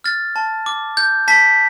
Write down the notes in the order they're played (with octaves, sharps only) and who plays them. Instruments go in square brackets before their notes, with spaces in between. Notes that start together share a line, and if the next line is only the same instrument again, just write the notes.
[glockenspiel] F6 A6
A5
D6
G6
A5 B6